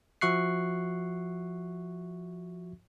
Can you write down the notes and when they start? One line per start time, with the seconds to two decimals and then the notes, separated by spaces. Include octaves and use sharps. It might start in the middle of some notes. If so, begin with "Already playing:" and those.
0.21 F3 F#4 E5 C#6 F#6 C7